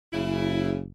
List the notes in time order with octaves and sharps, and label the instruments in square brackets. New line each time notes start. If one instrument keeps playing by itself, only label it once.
[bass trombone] F#1 [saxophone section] C#3 E4